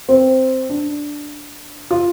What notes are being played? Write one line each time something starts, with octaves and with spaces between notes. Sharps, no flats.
C4
D4
F4